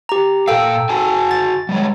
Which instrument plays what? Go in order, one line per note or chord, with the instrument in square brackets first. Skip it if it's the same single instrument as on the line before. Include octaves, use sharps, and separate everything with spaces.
[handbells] G4 A#5
[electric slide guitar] A#2 F5 [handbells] A4 G5 E6
[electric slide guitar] F#4 G#5 A5
[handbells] A6
[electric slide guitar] G3 G#3 C#5